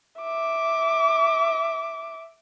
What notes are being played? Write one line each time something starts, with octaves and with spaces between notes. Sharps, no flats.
E5 D6